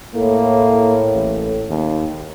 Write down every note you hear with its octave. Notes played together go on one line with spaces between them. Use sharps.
A2 A#3
A1
D#2